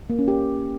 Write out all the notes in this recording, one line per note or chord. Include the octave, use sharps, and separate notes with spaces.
A#3
C#4
G4